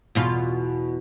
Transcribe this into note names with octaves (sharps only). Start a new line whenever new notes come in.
E2 B2 F4